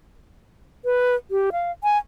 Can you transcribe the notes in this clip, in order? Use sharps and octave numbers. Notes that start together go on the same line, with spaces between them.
B4
G4
F5
G#5